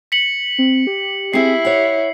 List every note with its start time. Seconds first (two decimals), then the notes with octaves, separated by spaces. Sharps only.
0.12 B6 C#7 F#7
0.58 C4
0.87 G4
1.34 C4 E4 G#4 C7
1.65 C#5 F#5